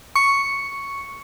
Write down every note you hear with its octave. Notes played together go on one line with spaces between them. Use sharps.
C#6 C#7